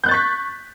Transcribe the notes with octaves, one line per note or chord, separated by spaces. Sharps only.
C#6 F#6 G6 A6 B6